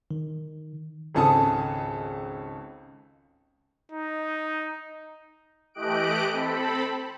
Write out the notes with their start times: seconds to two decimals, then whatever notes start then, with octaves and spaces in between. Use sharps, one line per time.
0.11 D#3
1.15 G#1 C#2 C#4 A4 A5 D#6
3.92 D#4
5.74 E3 A3 G4 D#5 F#6 D7
6.29 C4 A4 B5